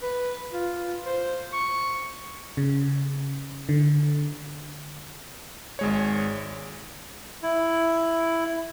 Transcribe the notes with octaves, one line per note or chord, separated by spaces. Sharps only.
B4
F4
C5
C#6
C#3
D3
G#1 G#3 C#5
E4